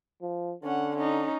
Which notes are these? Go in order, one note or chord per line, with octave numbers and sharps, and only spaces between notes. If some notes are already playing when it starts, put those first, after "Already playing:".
F3
D3 C#4 F#5
C#4 D#4